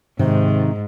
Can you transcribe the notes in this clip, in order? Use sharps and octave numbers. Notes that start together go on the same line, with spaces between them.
G#2 C3 D#3